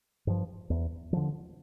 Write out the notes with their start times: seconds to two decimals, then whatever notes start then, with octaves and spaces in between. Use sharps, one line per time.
0.27 G2 F3
0.70 E2
1.13 D3 F3